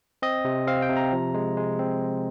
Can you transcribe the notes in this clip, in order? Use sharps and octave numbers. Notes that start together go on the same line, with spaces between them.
C4 D#5
C3
C4 F5
G5
C3
A#5
F3
G#3
G#3
C4